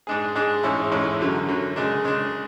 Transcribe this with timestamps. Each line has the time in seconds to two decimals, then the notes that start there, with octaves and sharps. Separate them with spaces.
0.07 G#2 G#3 D4 G#4
0.35 G#2 G#3 D4 G#4
0.63 A1 G#2 G#3 C#4 E4
0.92 A1 G#2 G#3 C#4 E4
1.19 F#2 D3 F#3
1.48 F#2 D3 F#3
1.76 C#3 G#3 D4
2.04 C#3 G#3 D4